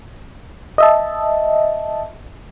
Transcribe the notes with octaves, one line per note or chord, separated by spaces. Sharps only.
D#5 E5 A5